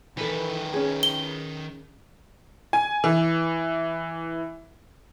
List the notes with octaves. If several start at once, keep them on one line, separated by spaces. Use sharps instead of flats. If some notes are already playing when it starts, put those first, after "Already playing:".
D#3 E3 A4 B4
C#4 G#4
G7
G#5
E3